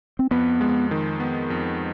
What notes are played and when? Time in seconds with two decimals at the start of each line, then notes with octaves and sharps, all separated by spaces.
0.19 C4
0.31 F2 B3
0.61 G#3
0.91 D#3
1.20 B3
1.50 F2